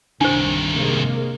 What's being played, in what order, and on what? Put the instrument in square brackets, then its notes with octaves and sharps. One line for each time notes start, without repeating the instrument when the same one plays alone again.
[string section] C2 [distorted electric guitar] G2 D#3 [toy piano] D4 C5
[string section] C3 G#3 A#3